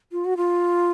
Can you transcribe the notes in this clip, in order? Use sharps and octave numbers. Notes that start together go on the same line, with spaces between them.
F4
F#4
F4